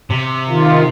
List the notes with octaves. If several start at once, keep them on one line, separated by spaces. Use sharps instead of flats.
C3
D#3 F4